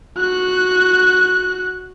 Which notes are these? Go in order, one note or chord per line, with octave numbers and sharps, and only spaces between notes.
F#4 F#6